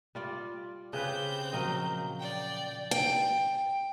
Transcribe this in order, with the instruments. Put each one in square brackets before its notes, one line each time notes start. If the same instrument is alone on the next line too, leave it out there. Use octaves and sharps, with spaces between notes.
[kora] G3 F4 D5
[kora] C#3 G4 B4 [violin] C4 G6
[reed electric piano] A#2 F3 F5 [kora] F#3 A#4 D#5
[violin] D5 G5
[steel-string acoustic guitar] G5